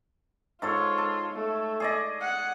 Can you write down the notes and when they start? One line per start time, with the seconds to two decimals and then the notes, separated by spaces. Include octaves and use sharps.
0.62 G#2 F4 A4 C#5
0.98 A4
1.34 A3
1.80 G#4 D5 D#5
2.21 F#5